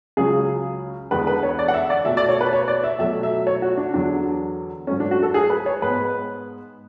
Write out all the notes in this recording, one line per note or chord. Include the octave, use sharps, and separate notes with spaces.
C#2 C#3 F#3 G#4
E2 D3 G#3 B3 B4
B4
C#5
D5
F#5
E5
D5
B2 A3 E5
D5
C#5
B4
C#5
D5
E5
B2 F#3 A3 E5
E5
C#5
F#4
D4
E2 D3 F#3 D4
G#2 F#3 A3 C#4
D4
F#4
A4
G#4
B4
C#5
G#2 G#3 B3 B4